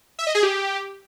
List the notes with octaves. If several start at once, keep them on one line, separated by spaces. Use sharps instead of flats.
E5
D#5
G#4
G4